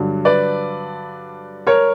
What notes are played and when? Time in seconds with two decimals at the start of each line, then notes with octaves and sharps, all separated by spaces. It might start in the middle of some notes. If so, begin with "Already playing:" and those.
Already playing: G2 D3 F#3
0.25 B4 D5
1.67 A#4 C#5